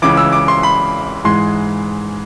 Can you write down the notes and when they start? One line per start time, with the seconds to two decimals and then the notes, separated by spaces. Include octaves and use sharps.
0.02 C#2 C#3 E3 D6
0.17 E6
0.33 D6
0.48 C6
0.63 B5
1.24 G#2 E3 G#3 C6